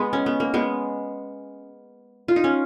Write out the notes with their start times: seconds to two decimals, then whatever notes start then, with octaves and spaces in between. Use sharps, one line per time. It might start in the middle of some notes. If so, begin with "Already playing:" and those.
Already playing: G#3 B3
0.13 C#4
0.26 B3
0.40 A#3
0.54 G#3 B3
2.28 F4
2.36 D#4
2.44 C#4